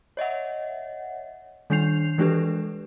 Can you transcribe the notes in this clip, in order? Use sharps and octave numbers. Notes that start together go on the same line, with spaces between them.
C#5 D#5 E5 F#5
D#3 G3 D4 G6 C7 F7
E3 G#3 D4 G4 A4 B4